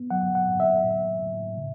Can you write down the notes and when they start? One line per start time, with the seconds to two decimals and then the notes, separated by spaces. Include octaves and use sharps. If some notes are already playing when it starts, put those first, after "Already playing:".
Already playing: B3
0.11 F#3 F#5
0.35 F#5
0.47 G#2
0.60 E5
0.84 A2
1.21 A2
1.57 C#3